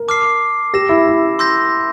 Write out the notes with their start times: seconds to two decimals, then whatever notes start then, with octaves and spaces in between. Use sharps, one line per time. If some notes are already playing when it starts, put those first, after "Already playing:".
Already playing: A#4
0.08 A5 D6 F6 C7
0.74 G4 E6 A#6 E7
0.89 E4
1.07 E4
1.39 C6 E6 G6 A#6